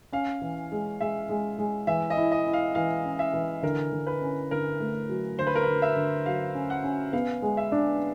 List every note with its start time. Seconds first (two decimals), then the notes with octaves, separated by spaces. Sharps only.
0.13 C#4 F5
0.41 E3
0.72 G#3
1.01 G#3 E5
1.29 G#3
1.59 G#3
1.87 E3 E5
2.10 D#5
2.17 E4
2.32 D#5
2.47 E4
2.53 F5
2.75 E3 F5
3.05 C#4
3.19 E5
3.34 E3
3.62 D3 A#4
3.92 D3
4.07 B4
4.22 C#4
4.51 D3 A#4
4.80 A3
5.09 F#3
5.39 D3 C5
5.47 B4
5.55 A#4
5.63 D3 B4
5.82 E5
5.96 D3
6.26 F#3 F5
6.55 C#4
6.70 F#5
6.84 C#4
7.13 B3 F5
7.42 G#3
7.57 E5
7.72 D4